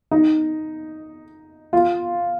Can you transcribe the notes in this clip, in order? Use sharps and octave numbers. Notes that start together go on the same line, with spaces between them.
D#4
F4